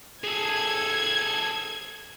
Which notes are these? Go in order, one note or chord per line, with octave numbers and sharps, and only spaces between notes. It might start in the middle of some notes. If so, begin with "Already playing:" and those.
G#4 A4 G#6